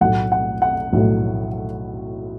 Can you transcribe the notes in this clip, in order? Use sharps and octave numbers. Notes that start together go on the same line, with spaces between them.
B1 A2 F#3 A3 F#5
F#5
F#5
B1 A2 F#3 A3